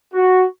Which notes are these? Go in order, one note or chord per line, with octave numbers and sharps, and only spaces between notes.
F#4